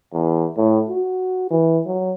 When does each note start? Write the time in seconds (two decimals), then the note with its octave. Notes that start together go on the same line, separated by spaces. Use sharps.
0.13 E2
0.57 A2
0.89 F#4
1.51 E3
1.86 F#3